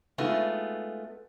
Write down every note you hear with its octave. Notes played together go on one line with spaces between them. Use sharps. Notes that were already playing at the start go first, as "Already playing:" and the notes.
G#3 A3 B3 D#4 F4 F#4